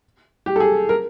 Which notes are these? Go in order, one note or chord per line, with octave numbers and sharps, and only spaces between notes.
G4
A4
G#4
A#4